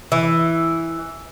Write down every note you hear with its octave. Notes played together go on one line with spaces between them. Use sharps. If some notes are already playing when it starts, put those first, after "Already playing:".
E3